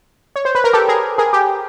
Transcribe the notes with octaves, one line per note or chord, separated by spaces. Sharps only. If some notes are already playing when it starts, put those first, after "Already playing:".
C#5
C5
B4
A#4
G4 A4
G#4 A#4
G#4 A#4
G4